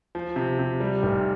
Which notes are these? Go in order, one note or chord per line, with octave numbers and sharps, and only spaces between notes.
F3
C3
C3
G3
F1